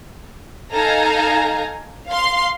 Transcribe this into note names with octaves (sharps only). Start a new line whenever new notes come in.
D#4 A4 F5 G#5 A#5
F5 C6